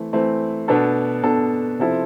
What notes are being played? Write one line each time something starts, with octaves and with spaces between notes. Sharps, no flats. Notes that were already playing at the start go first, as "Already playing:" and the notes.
Already playing: E3 A3 C4
E3 A3 C4
B2 B3 D4 A4
B2 B3 D4 A4
C3 F3 C4 E4 A4